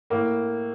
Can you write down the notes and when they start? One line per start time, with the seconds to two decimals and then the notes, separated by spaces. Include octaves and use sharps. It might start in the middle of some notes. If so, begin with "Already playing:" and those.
0.10 A2 A#3